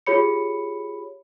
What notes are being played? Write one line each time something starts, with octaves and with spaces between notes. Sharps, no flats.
F4 G4 G#4 C#5 B5 C#7